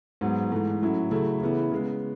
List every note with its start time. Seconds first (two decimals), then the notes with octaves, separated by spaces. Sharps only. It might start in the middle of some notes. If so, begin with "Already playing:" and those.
0.21 G#2 F#3 B3
0.52 G#2 E3 A3
0.82 A2 F#3 C#4 E4
1.11 C#3 F#3 A3 E4
1.41 C#3 E3 B3 E4
1.72 C#3 G#3 B3